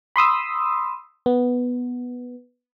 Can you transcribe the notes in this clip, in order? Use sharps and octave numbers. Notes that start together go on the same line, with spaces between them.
B5 C6 D#6 E6
B3